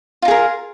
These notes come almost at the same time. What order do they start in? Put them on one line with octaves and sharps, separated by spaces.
F4 D#4 G#4 A#4